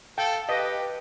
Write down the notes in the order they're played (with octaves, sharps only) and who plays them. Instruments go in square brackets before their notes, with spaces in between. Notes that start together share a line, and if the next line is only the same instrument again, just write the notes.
[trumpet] A4 [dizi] F5 [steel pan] G5
[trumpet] G4 [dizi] B4 [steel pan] D#5